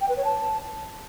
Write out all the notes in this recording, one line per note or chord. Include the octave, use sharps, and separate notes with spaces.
G5
B4
C#5
A5